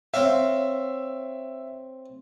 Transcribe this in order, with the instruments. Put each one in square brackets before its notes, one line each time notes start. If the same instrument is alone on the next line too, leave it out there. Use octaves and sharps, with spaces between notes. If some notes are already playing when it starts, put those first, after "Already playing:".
[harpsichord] C4 C#5 F5 [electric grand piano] E5